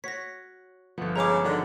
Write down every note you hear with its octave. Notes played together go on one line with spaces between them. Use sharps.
F#4 C#5 A#6 B6
G1 F3 B3 A4
C#3 G#3 G#4 A#5 D6
D3 D#3 F#3 C#4